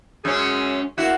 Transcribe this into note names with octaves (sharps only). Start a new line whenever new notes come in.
F#2 G#3 C#4 G#4
A#3 E4 F#4